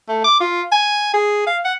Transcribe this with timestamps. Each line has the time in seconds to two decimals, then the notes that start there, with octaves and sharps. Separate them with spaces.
0.08 A3
0.24 D6
0.40 F4
0.72 G#5
1.14 G#4
1.46 F5
1.65 F#5